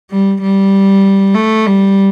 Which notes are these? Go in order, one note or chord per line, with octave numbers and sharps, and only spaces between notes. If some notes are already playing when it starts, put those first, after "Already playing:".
G3
G3
A3
G3